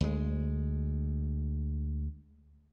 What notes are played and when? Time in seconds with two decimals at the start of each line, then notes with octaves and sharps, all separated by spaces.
0.01 D2 G#3